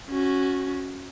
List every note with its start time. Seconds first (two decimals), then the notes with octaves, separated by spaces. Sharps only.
0.10 C#4 F#4